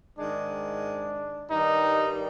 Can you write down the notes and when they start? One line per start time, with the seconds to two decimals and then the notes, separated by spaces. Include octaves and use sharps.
0.19 G#2 D#3 G#3 D4
1.51 G2 D#3 G3 D#4